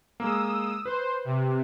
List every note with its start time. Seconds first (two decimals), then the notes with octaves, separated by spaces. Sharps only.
0.20 G#3 A#3 D#6 E6
0.86 B4 C5
1.25 C3